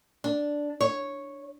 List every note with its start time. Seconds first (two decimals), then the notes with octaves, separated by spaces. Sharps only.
0.24 D4
0.81 C#5